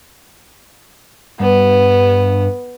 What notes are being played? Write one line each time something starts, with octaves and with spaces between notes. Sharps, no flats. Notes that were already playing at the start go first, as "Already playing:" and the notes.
G2 B3